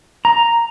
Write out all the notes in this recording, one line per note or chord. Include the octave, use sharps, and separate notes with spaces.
A#5